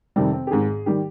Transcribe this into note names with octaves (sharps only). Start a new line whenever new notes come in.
F2 C3 D#3 G3 C4
C4
G4
G#1 G#2 D#3 G#4
D#3 G3 G4